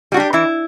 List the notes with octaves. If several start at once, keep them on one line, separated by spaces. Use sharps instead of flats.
G3 D4 F#4 G4
E3 E4